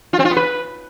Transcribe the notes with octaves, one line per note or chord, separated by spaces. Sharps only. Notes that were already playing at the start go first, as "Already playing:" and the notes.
F4
C4
F4
B3
B4